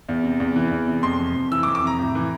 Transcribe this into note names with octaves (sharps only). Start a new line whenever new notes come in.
E2
C3
E2
E3
E2
C3
F2 C6
C3
F2
E3 E6
D6
F2
D6
C3 A#5
A2
E3